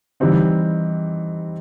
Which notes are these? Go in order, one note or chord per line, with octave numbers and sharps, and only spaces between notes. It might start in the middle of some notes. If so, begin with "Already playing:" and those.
E3 G3 C4 D#4